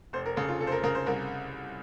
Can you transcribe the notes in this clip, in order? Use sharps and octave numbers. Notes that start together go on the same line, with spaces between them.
F1 C5
A#4
C#3 A4
F4
F1 A4
C5
A#4
C#3 A#4
C5
C2 A#4